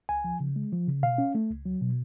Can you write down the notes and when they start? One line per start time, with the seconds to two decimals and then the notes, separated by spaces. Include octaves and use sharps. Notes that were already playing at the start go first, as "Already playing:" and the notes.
0.09 C#2 G#5
0.24 F3
0.40 C#3
0.56 G#3
0.72 F3
0.88 C#3
1.03 B2 F5
1.18 C#4
1.35 A3
1.50 C#2
1.66 F#3
1.82 B2